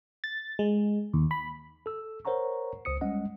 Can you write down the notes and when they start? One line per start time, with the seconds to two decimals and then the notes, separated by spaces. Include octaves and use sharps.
0.24 A6
0.59 G#3
1.14 D#2
1.31 B5
1.86 A4 E6
2.25 A#4 C5 C#5 F#5 A#5 C#6
2.85 C#2 C5 D#6 C#7
3.01 G3 G#3 C#4 D#5 F#5